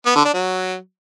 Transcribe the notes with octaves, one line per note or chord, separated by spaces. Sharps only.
B3
D3
D4
F#3